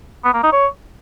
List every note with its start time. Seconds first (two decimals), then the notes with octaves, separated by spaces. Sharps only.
0.24 B3
0.34 A#3
0.43 D#4
0.52 C#5